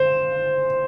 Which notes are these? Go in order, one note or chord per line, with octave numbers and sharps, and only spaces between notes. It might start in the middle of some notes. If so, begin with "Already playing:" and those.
Already playing: C5